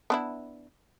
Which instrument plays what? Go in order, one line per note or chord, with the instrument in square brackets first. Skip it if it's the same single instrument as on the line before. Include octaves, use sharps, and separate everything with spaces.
[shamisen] B3 D4 E4